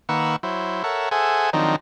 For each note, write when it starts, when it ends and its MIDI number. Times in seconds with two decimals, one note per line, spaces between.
0.09 0.36 51
0.09 0.36 58
0.09 0.36 71
0.09 0.36 78
0.09 0.36 85
0.09 0.36 88
0.43 0.83 54
0.43 0.83 64
0.43 0.83 72
0.84 1.09 69
0.84 1.09 70
0.84 1.09 73
0.84 1.09 76
0.84 1.09 78
1.11 1.50 68
1.11 1.50 69
1.11 1.50 72
1.11 1.50 76
1.11 1.50 78
1.11 1.50 80
1.53 1.76 51
1.53 1.76 53
1.53 1.76 54
1.53 1.76 60
1.53 1.76 62
1.53 1.76 63